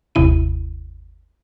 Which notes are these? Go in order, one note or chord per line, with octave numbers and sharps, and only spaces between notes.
G1 D#2 C3 E4 D#7